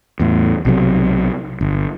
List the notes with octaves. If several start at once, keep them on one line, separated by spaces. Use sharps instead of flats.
E2 A2
B1 C3 F#3
G1